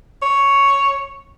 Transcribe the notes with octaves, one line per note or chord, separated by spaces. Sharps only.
C#5